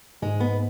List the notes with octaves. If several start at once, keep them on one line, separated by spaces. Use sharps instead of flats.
G#2 G#3
B3